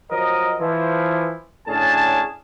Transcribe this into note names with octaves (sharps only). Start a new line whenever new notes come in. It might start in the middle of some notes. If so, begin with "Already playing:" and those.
F3 F#3 A#4 D#5
E3 F3
A2 D3 C#4 D4 G#4 A5